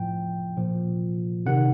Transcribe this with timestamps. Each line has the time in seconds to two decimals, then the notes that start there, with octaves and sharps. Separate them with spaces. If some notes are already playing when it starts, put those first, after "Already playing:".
Already playing: A2 F3 G5
0.57 A#2 F3
1.46 C3 D#3 F#5